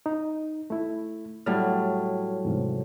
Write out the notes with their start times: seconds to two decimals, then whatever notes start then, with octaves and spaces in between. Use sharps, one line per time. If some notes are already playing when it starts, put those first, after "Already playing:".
0.06 D#4
0.70 A3 E4
1.46 A2 F#3 G3 F6
2.45 E2 G#2 C3